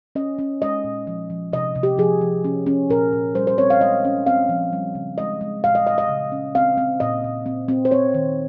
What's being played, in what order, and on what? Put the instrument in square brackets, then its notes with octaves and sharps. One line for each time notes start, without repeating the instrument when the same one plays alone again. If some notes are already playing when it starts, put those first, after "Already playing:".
[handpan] C#4 D#5
C#4
G#3 D#5
A#2
F3
F3
C3 D#5
C3
G4
F3 G#4
F3
C#4
C#4
A#2 A#4
A#2
G3 C5
C5
C4 C#5
F5
G#3 D#5
C#4
C4 F5
F3
G3
C#3
G#3 D#5
G#3
A#2 F5
D#5
A#2 D#5
D#5
C#3
C#4
C4 F5
C4
A#2 D#5
A#2
C4
C4
C5
C4 C#5
D#3